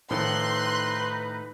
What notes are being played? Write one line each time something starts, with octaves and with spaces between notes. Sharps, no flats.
A2 D#3 F3 D#4 B4 C6 F#6